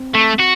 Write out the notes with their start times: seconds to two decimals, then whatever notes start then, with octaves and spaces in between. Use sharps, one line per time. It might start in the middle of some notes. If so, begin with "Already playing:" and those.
Already playing: C4
0.15 A3
0.40 F#4